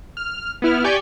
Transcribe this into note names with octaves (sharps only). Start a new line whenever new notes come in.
F6
B3 E4 F6
G4 D5 G5 G#5 C#6 G6